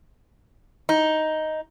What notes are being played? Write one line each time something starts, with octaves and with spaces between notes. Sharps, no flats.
D#4